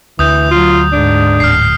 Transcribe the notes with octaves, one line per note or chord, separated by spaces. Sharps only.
D2 E3 D#6 G6
F#3 F4
G#2 D4
D1 F6 C7